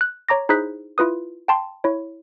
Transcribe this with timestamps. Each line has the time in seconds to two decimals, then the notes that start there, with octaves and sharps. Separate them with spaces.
0.01 F#6
0.29 C#5 A#5 D6 A#6
0.49 D#4 E4 G#4 C5 F#6 B6
0.98 E4 F4 B4 D#6
1.48 G5 A5 C6
1.84 E4 C#5